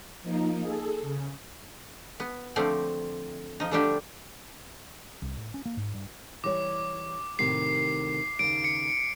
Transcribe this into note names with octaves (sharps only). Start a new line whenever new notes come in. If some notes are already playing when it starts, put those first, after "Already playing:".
F3 A#3 D#4
G#4 A4
C#3
B3
D3 F3 A3 C4 D5
F3 D#4
D3 F3 G3 A3 D4 G4
C2
A2
C#4
A#3
G#2
G2
E3 G3 C#5 D6
A2 C3 D#3 C7
D#2 C#3 D7
C#7